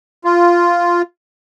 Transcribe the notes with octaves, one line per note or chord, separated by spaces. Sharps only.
F4